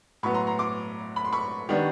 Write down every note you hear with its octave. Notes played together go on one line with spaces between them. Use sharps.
A2 F#3 B3 B5 C#6
A#5 C6
A#5 C6
C6 D6
B5
C6
B5 C#6
D#3 G3 B3 D4